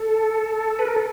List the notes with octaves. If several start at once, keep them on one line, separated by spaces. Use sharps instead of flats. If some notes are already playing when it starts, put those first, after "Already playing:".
Already playing: A4
B4
A#4
A4